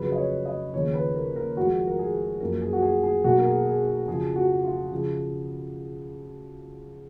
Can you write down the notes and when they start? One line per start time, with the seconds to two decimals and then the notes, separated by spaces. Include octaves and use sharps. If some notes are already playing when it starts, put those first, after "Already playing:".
Already playing: F2 C#3 F#3 B4
0.12 D#5
0.18 C#5
0.46 D#5
0.73 D#2 C#3 F3 C#5
0.94 B4
1.15 A#4
1.36 A#4
1.57 F2 F3 G#3 F#4
1.87 A#4
1.99 G#4
2.40 F#2 F3 A#3 A#4
2.62 G#4
2.73 F#4
2.82 G#4
3.03 G#4
3.24 B1 B2 A#3 F#4
3.38 A#4
3.45 G#4
3.66 G#4
3.87 G#4
4.07 F2 C#3 F3 G#4
4.36 F#4
4.64 F4
4.92 C#3 F3